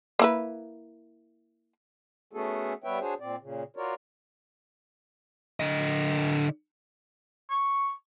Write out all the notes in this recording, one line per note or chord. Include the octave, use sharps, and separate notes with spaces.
A#3 E4 B4
A3 B3 C#4 F#4 G#4 A4
G3 B3 B4 C#5 E5 G5
D4 F#4 G#4 C5 C#5
A#2 C4 D5
A#2 C#3
F4 F#4 A#4 C#5 D5
D3 D#5
C#6